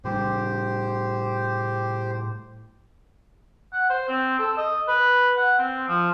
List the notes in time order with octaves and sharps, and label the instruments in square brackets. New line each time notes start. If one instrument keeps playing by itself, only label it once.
[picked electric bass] A2 G3 [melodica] G4 C5
[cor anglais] F#5
C5
C4
A4
D#5
B4
F#5
C4
F3